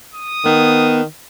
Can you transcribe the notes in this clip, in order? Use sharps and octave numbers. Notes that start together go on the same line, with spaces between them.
D#6
D#3 B3